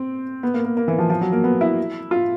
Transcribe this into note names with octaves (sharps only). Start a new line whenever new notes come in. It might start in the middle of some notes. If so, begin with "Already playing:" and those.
Already playing: C4
B3
A#3
A#3
A#3
E3
F3
F3
F#3
A#3
B3
E4
F4